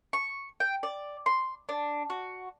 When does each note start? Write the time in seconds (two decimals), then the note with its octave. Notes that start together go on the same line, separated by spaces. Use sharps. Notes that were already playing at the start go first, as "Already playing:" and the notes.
0.13 C#6
0.60 G5
0.83 D5
1.26 C6
1.69 D4
2.10 F#4